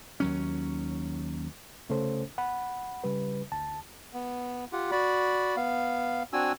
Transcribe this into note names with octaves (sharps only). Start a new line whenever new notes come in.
D#2 F#3 C#4
C2 C#3 A3 C#4 A4 C5
F#5 B5
C#3 G3 B4
D2 A5
B3
F4 G4 F#5
F#4 D5 B5
B3 F5
C4 D4 F#4 G#5 E6